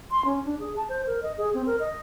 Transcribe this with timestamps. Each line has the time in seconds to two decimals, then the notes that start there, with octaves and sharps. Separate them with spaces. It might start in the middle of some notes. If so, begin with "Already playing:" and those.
0.11 C6
0.25 C#4
0.45 D4
0.59 G#4
0.77 A5
0.89 C5
1.07 A#4
1.23 D#5
1.38 G#4
1.54 C4
1.66 A#4
1.80 D#5